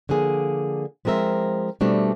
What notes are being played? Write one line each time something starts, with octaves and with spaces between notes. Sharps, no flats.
D3 F3 A#3 G#4
F3 G#3 C4 A#4 E5
B2 G3 A3 C4 D4